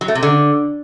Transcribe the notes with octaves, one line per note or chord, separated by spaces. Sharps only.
F#3
A3
C3
D3